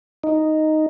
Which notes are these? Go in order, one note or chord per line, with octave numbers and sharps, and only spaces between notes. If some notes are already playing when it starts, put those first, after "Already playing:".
D#4